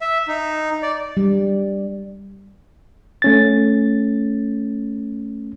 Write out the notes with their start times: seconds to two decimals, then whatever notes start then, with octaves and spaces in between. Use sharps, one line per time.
0.01 E5
0.28 D#4
0.82 D5
1.17 G3
3.22 A3 C#4 A6